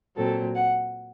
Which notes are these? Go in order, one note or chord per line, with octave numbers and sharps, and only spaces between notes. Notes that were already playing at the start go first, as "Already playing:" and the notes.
A#2 F#3 C4 A4
F#5